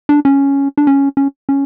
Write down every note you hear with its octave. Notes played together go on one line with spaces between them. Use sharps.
D4
C#4
D4
C#4
C#4
C#4